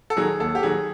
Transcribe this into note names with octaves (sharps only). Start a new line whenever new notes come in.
A4
D#3 F#3 G#4
D#2 A4
G4
D#3 F#3 G#4